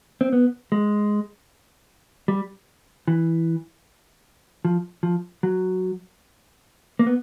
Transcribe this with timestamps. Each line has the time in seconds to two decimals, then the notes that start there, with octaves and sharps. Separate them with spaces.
0.21 C4
0.33 B3
0.72 G#3
2.28 G3
3.08 E3
4.65 F3
5.03 F3
5.43 F#3
6.99 A#3
7.06 B3